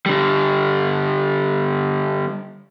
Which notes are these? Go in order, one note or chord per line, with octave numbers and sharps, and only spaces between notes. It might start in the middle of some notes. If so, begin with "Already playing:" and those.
D3 G3